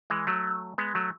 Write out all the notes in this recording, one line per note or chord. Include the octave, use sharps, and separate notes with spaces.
E3 G#3
F#3 A3
G#3 B3
F#3 A3